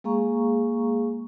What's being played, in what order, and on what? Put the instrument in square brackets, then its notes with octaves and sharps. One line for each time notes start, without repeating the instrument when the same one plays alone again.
[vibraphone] G#3 A#3 G#4 F5 A#5 C#6